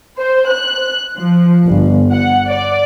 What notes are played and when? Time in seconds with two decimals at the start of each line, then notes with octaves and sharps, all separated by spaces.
0.18 C5
0.51 F#6
1.17 F3
1.65 G1
2.12 F#5
2.49 D5